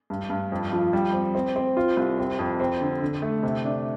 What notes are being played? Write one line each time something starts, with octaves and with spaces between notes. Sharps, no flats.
G2
G2
F2
F3
G3
C4
C4
C4
F4
C2
C4
F2
C4
D3
D3
A3
C3
D4